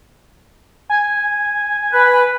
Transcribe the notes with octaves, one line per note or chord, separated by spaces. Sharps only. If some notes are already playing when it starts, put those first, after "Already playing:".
G#5
B4